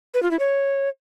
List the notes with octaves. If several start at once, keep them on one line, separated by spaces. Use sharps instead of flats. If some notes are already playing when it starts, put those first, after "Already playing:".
B4
F4
E4
C#5